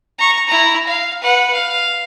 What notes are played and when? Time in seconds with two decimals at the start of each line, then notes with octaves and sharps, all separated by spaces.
0.18 A#5 C#6
0.48 E4 A#5
0.87 F5
1.22 B4 F#5
1.54 F5